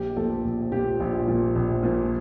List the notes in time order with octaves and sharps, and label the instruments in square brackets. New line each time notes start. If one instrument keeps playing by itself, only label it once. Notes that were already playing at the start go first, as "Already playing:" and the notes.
Already playing: [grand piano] A#1 G4
A#2 F3 A4
A#1
A#2 F3 G4
A#1 F4
A#2 F3
A#1
A#2 F3